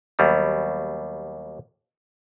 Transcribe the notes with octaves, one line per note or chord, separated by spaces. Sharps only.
D#2 F#3 G3 B3